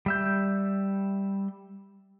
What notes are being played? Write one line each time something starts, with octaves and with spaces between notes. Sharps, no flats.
G3 E5 G6